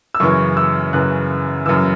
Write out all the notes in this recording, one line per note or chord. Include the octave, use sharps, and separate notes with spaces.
E6
F#2 C#3 E3 C#6
E6
F#2 C#3 E3 F#6
F#2 C#3 E3 E6